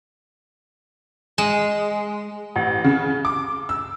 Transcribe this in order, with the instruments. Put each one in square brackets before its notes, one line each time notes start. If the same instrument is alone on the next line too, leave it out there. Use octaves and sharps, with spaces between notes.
[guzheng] G#3
[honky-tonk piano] A1
C#3
D6
E6